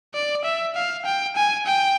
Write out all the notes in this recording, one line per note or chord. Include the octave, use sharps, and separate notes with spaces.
D5
E5
F5
G5
G#5
G5